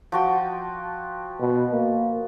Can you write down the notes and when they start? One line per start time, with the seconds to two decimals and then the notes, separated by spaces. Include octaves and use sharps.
0.12 F3 F#4 G5
1.40 B2
1.73 A#3